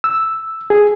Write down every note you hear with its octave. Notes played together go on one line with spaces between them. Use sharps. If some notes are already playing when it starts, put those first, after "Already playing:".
E6
G#4